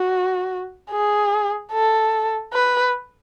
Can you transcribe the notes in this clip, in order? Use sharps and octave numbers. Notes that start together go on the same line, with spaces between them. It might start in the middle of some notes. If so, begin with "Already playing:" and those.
Already playing: F#4
G#4
A4
B4